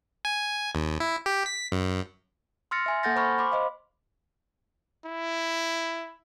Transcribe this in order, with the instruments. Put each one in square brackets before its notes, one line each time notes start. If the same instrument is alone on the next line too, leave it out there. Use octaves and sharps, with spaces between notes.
[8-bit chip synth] G#5
D#2
E4
G4
B6
F#2
[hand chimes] C6 E6 F6 A6 A#6 C#7
E5 G#5 C6
A#3 A4 F#5 G6 A6 A#6
C5 G#5 B5 C#6 F6
B5 C6 D6
C5 D#5 F5
[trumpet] E4